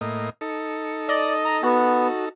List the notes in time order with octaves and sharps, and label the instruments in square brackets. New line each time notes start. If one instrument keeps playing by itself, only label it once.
[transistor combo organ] A2 A#3 D#5
[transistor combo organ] D#4 A4 [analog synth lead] C#7
[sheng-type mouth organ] D5 [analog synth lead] D#5
[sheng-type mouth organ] A#5
[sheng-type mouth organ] B3 [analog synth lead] F#4